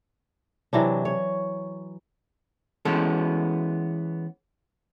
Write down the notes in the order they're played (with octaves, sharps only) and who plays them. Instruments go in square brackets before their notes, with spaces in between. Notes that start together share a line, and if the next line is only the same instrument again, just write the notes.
[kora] C3 E3 F#3 D4
C#5
[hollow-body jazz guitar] E3 G#3 B3 C#4 A4